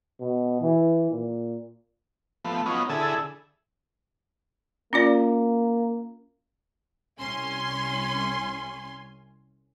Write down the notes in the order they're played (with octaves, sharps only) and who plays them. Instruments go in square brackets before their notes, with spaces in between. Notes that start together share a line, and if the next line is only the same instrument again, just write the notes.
[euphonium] B2
E3
A#2
[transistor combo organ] F3 A3 B3
F#3 B3 C#4 D#4 F4
D3 E4 G#4 A4
[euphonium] A#3 [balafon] C#4 F4 D5
[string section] C2 C#4 G#5 C6